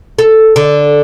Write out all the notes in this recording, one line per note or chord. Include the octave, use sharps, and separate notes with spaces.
A4
D3